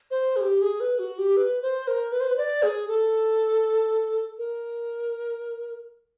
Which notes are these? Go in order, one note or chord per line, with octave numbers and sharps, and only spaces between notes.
C5
G#4
G4
G#4
B4
F#4
G4
B4
C5
A#4
B4
C5
B4
D5
G#4
A4
A#4